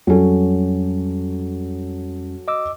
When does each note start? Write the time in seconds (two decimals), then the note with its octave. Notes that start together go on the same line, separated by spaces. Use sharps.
0.07 F2 F#3 G3 C#4 A4
2.48 D#5 D6 E6